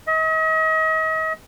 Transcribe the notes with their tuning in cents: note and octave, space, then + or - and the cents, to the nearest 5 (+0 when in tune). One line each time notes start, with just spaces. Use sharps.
D#5 +40